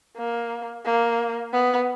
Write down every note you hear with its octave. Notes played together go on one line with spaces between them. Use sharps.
A#3
A#3
B3